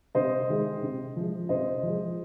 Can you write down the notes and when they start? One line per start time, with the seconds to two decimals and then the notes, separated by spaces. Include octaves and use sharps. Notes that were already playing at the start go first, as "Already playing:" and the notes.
0.15 C3 C5 D#5
0.49 D#3 G#3
0.82 C3
1.16 F3 G#3
1.49 C3 C5 D#5
1.83 F3 G#3